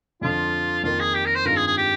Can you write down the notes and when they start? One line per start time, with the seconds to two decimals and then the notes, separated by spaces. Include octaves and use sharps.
0.21 F2 D3 F3 F4
0.83 F2 D#3 A#3 F4
1.00 G#4
1.15 G4
1.26 A#4
1.35 C5
1.45 G2 D#3 G#3 C4 F4 A#4
1.56 G#4
1.67 G#4
1.77 G4